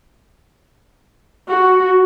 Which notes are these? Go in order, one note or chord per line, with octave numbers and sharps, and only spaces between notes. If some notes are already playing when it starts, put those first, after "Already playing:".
F#4